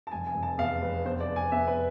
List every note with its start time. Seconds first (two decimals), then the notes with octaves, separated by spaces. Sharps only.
0.07 A5
0.12 F1 G#5
0.27 G#5
0.34 F1
0.43 A5
0.58 E2 F5
0.81 F1 B4
1.05 B3 C5
1.20 D5
1.28 B3
1.36 G#5
1.52 B3 E5
1.67 B4